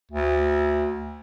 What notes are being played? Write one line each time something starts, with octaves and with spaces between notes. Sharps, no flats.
D2